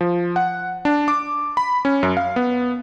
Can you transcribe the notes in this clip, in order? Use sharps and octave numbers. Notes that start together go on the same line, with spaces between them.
F3
F#5
D4
D6
B5
C#4
F#2
F5
B3